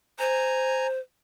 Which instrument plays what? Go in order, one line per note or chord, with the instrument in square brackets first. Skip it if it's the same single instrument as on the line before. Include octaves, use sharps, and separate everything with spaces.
[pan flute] C5 [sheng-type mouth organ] G#5 A#5